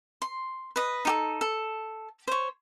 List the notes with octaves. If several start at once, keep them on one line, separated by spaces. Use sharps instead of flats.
C6
B4 D#5
D#4 G4 A4
A4
C5 C#5